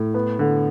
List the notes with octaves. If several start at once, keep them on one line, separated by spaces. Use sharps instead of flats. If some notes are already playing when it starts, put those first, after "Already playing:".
Already playing: A2
B3
D3